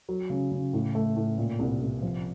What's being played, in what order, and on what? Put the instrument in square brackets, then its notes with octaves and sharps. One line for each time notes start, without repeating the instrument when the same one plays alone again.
[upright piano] F#3
C#3
C#3
A2
A3
A2
A#2
C2
C2
F3